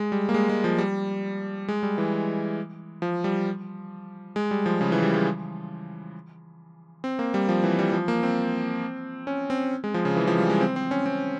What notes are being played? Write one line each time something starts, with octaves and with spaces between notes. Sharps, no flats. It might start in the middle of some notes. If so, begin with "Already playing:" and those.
Already playing: G#3
G3
A#3
G#3
G#3
F3
G3
G#3
G3
E3
F3
G3
G#3
G3
F3
C#3
E3
G3
G#3
C4
A#3
G3
F3
E3
G3
F3
A#3
C4
C#4
C4
G#3
F3
C#3
E3
F3
G3
G#3
C4
C4
C#4
C4